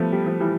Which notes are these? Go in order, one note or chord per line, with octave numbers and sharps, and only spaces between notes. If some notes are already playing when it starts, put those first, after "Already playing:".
Already playing: F3 G3 A3 B3
G3
F3
E3 G3